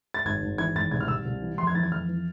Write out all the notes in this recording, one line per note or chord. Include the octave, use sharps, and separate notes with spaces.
A6
G#1 G#6
G#1
E3 G#6
G#1 A6
C2 G#6
F6
C2 E6
C2
E3
F2 C6
G#6
E3 A6
G#6
F2 F6
E3